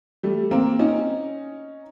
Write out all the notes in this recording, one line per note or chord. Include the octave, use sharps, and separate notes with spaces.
G3 A3
A#3 C4
C#4 D#4